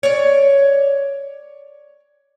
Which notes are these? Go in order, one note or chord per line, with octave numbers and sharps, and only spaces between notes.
C#5 D5